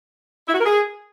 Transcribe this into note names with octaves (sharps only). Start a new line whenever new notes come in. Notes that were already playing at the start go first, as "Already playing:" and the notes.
E4
F#4
A#4
G#4